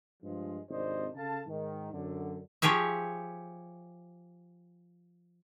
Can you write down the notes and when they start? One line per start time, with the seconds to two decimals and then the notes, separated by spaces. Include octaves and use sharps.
0.23 G2 F3 G#3
0.70 G#1 C3 D4 C5 D5 D#5
1.15 C#3 A4 F5 A5
1.47 G#2 D#3
1.93 F#2 D3
2.62 F3 G4 G#4 C#5 E5